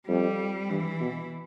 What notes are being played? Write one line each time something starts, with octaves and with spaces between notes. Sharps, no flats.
F2 G3
G2 E3
B2